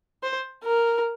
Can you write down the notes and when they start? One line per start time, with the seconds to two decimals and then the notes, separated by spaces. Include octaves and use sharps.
0.23 C5
0.64 A#4